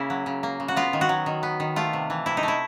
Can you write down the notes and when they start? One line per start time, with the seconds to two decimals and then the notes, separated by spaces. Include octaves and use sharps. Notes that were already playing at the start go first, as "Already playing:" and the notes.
Already playing: C#3 A#3 E4
0.10 F#3
0.26 C#3
0.43 A#3
0.60 C#3
0.68 F#4
0.76 B3 F4
0.93 D#3
1.01 F#4
1.09 F#3
1.26 D#3
1.43 B3
1.60 D#3
1.76 A3 F4
1.93 C3
2.10 E3
2.26 C3 E4
2.37 D#4
2.43 A3
2.48 E4